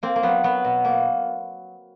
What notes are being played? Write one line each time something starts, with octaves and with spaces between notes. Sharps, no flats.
A#3 C4
A#3
F#3 B3
F#3 B3
B2
A#3